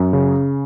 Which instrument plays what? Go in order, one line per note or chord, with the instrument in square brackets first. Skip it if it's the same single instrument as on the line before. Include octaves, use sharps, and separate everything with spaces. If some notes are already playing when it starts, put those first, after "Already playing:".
Already playing: [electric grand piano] F#2
C#3